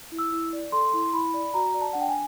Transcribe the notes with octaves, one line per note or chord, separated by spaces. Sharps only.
E4
E6
E4
D5
A4 C6
E4
E4 B5
D5
F#4 A#5
D5
A5
D4 F#5
G5
G#5